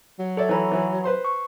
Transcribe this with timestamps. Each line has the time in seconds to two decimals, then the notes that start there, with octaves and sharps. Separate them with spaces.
0.19 F#3
0.37 A4 C#5 D5 E5
0.49 E3 C#5 A#5 B5
0.72 E3
1.04 B4 C5 C6
1.25 C#6